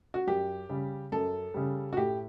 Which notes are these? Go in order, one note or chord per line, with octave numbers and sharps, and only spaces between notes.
F#4
F#2 G4
C#3 G3
F#2 A4
C#3 G3
F#4
A2 G4